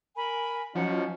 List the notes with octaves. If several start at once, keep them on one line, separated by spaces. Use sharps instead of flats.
A#4 G#5 B5
F3 F#3 C#4 D#4 F#5